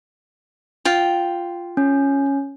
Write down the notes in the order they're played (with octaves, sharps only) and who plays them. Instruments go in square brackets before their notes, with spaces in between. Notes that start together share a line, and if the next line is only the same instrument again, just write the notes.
[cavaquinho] F4 G5
[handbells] C#4